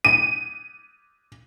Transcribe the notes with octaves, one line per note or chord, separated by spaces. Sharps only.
D#7